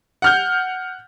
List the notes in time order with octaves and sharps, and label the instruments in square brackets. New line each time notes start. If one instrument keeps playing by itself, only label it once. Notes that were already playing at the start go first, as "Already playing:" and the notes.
[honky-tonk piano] F#5 F6 G6